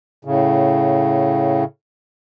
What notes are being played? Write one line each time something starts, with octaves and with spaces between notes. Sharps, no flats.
A2 C#3